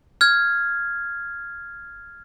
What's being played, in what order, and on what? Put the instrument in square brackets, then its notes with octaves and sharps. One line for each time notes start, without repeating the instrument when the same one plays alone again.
[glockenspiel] F6 G#6